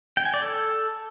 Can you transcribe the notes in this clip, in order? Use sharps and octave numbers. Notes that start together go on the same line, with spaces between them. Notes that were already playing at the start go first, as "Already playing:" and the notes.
G5
G#5
D5
A4